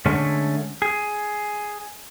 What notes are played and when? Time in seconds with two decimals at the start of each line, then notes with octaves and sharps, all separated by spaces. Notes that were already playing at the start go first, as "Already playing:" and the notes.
0.06 D3 G#3 A3 C#4
0.82 G#4